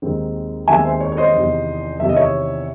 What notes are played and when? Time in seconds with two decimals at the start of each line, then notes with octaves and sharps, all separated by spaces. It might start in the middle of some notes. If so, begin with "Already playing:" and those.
0.02 D#2 D#3 G#3 C4
0.68 D#2 D#3 G#3 C4 E5 G#5
0.85 C5
1.00 C#5
1.12 C#5
1.17 C5 D#5
1.34 E2 C3 D#3
1.99 E2 C3 D#3 E5
2.09 D#5
2.16 C#5 E5